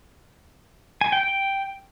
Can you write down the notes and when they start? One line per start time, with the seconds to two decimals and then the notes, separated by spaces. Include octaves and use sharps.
1.01 G#5
1.12 G5
1.23 G5